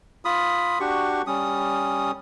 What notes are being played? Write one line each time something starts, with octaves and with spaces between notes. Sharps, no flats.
F4 B5 D#6
D4 F#4 G4 C#6
G3 C#4 D#6